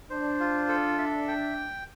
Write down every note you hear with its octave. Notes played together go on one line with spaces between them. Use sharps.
D4 C5
F4
A4
E5
G5